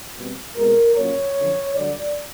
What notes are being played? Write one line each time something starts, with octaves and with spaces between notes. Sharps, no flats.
B2 G3 C4
B2 G#3 C4 A#4
A#2 F#3 A#3 C#4 C#5
F#2 D3 F3
G2 D3 F#3 D5